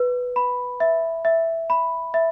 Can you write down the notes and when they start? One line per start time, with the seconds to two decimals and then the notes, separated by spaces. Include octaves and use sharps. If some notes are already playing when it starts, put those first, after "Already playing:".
Already playing: B4
0.36 B5
0.80 E5
1.25 E5
1.70 B5
2.14 E5